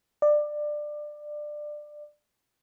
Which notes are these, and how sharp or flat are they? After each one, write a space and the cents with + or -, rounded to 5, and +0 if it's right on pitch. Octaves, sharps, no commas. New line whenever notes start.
D5 +20